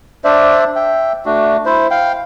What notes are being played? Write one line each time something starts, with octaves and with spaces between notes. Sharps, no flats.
D4 C5 D5 E5
E5 G5
A3 D4 F#4
E4 C5
F5 G5